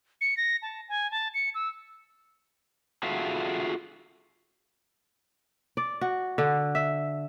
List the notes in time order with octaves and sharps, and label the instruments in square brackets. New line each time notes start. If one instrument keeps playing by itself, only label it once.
[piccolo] C#7
A#6
A5
G#5
A5
C#7
E6
[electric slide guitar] F4 F#4 G#4 A4 E5 F5
[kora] D5
F#4
D3
E5